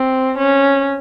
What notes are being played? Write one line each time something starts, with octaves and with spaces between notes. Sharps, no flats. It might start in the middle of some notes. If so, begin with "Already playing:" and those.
Already playing: C4
C#4